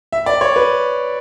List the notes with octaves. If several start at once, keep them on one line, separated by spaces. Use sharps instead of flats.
E5
D5
C#5
B4